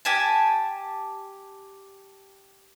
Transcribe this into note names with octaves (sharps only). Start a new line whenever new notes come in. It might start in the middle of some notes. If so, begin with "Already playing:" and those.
G4 G#5 A5